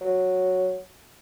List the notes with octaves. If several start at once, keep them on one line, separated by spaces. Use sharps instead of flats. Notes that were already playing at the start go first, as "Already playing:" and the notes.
F#3